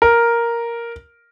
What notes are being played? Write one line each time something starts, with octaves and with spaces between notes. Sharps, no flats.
A#4